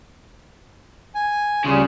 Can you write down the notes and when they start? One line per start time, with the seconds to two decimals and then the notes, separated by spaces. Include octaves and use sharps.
1.15 G#5
1.65 D2 C#3 G3 F4 G#4